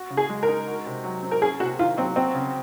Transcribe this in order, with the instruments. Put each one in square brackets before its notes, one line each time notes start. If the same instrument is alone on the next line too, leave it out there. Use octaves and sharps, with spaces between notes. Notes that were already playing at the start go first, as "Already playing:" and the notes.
Already playing: [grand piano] F#4
C#3
[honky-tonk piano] G#4
[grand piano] G#3
[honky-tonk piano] A#4
[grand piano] D#4
F#4
C3
F#3
C4
[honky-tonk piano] A#4
[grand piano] C#4 [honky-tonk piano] G#4
[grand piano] C3 [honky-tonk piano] F#4
[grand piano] D#3 [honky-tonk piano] F4
[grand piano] F#3 [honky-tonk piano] C4
[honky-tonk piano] C4 [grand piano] F#4
[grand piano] C#3